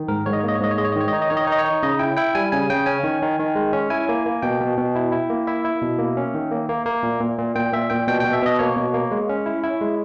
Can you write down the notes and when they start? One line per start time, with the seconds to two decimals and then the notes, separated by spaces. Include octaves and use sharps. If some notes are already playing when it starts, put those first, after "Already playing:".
Already playing: D#3
0.08 G#2 A#4
0.26 G#2 C#5
0.33 D#5
0.40 C#5
0.43 A#3 D#5
0.55 C#5
0.61 G#2 D#5
0.71 C#5
0.78 G#3 D#5
0.85 C#5
0.92 D#5
0.96 D#3 C#5
1.08 D#5
1.13 D#4 C#5
1.22 D#5
1.30 D#3 C#5
1.37 D#5
1.45 D#4 C#5
1.52 D#5
1.58 C#5
1.65 D#4
1.83 C#3 D#5
1.99 E4 G5
2.17 E4 G5
2.35 G3 G#5
2.52 C#3 G#5
2.70 C#3 G5
2.86 C#4 G#5
3.04 D#3
3.22 D#3
3.39 D#3
3.56 G#3
3.73 C#4
3.90 E4 G#5
4.09 A#3
4.26 A#3
4.42 B2 G5
4.61 B2
4.77 B2
4.95 E4
5.12 E4
5.30 A#3
5.47 E4 E5
5.65 E4
5.82 B2
5.99 A#3
6.17 C#4
6.34 D#3
6.51 A#3
6.69 A#3
6.86 A#3
7.03 A#2
7.20 A#2
7.38 A#2
7.55 A#2 G5
7.73 A#2 E5
7.90 A#2 G5
8.08 B2 G5
8.20 B2 G5
8.33 E5
8.42 B2 D#5
8.59 A#3 C#5
8.76 B2
8.94 A#3
9.11 G#3
9.29 C#4
9.46 E4
9.64 E4
9.81 G#3